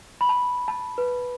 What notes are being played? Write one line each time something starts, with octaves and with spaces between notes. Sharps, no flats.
B5
A5
A5
B4